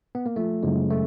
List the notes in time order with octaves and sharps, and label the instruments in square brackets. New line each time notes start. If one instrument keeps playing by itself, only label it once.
[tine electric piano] B3
A#3
[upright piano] F3 [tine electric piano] A3
[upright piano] F#1 [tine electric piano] G#3
[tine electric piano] A3